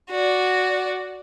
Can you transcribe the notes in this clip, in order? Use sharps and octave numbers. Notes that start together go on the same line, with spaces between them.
F#4 D5